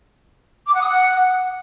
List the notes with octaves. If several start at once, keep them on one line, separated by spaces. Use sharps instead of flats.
D6
F#5
D#6
F#5